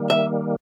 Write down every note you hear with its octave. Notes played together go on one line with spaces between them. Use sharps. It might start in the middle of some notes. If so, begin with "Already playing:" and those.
Already playing: D#3 G3 A#3
E5